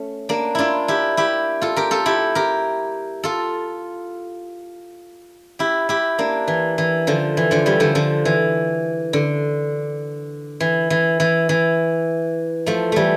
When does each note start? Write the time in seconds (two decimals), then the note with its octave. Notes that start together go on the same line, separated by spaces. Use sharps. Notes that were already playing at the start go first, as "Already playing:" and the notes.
Already playing: A3 C#4
0.29 A#3 D4
0.55 D4 E4 F4
0.88 E4 G4
1.17 E4 G4
1.62 F4 A4
1.76 G4 A#4
1.91 F4 A4
2.06 E4 G4
2.35 G4 A#4
3.23 F4 A4
5.59 E4 G4
5.89 E4 G4
6.19 A#3 D4
6.48 E3
6.78 E3
7.07 D3 F3
7.37 E3
7.51 D3 F3
7.66 E3 G3
7.80 D3 F3
7.95 D3 F3
8.25 E3
9.13 D3
10.60 E3
10.90 E3
11.20 E3
11.49 E3
12.66 F3 A3
12.92 E3 G3 A3